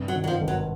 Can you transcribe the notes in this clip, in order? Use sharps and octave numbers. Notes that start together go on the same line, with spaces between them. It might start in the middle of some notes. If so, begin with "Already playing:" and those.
Already playing: G2 C3
F#3
D#3
F#3
F3
G#1
F#3